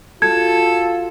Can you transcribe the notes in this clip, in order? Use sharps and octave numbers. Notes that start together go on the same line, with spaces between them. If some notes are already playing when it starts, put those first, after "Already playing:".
F4 F#4 A4 G#6